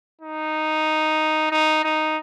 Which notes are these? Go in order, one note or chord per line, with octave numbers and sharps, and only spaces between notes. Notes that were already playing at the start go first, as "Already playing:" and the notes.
D#4
D#4
D#4